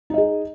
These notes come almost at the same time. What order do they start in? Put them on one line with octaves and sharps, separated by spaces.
D#4 D#5 G#4